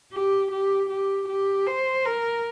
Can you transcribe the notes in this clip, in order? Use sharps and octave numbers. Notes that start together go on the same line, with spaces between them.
G4
G4
G4
G4
C5
A#4